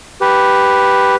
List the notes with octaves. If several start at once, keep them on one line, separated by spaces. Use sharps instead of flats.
G4 B4